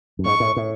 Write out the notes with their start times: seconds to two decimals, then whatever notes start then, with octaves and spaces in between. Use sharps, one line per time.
0.19 F#2
0.25 G#2 C#6
0.40 A2
0.56 A2